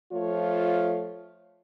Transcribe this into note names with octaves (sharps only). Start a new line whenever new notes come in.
F3 A3 F4 C#5